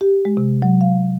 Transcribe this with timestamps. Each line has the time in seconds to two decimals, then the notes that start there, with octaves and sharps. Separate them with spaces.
0.01 G4
0.25 G#3
0.37 C3
0.62 F#3
0.81 F5